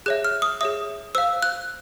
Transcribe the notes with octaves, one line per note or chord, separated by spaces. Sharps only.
G#4 C#5 E5 F#6
F6
D#6
G#4 C#5 E5 D#6
C5 F5 E6
F#6